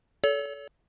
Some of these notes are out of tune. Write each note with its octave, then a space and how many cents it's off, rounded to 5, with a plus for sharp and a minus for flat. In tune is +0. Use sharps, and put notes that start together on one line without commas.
A4 -15 C#5 +40